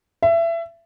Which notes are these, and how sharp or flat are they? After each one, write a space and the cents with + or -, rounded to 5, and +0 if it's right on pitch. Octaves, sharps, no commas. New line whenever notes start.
E5 +25